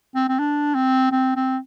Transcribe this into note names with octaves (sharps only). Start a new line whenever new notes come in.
C4
C4
D4
C4
C4
C4